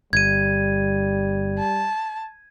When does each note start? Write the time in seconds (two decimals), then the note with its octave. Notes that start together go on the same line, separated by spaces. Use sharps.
0.13 G1 G3 G#6 D#7
1.58 A5